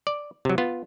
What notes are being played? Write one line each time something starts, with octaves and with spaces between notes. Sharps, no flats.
D5
C3 F#3
B3 F4